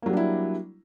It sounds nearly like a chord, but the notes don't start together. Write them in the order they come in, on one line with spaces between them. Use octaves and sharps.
A#3 F#3 G3 D4 E4